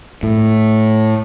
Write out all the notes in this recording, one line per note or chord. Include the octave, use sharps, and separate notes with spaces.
A2